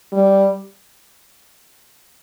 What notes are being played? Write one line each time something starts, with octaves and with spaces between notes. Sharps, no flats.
G3